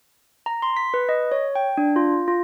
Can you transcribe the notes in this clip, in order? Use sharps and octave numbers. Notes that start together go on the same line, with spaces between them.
A#5
C6
B6
B4
D#5
C#5
G5
D4
F4
F4